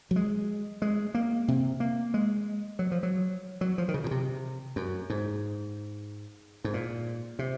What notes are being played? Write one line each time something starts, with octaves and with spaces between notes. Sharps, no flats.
F#3
G#3
G#3
A#3
C3
A#3
G#3
F#3
F3
F#3
F#3
F3
D#3
C#3
A#2
C3
F#2
G#2
G#2
A#2
C3